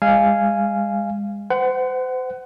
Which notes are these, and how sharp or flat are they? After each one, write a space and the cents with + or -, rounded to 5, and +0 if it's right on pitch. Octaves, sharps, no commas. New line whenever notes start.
G#3 -35 F5 -15 G#5 +0
C5 -35 F#5 +20